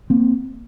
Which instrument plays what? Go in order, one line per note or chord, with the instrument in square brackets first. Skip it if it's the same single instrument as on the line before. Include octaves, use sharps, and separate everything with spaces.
[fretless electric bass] A#3 C4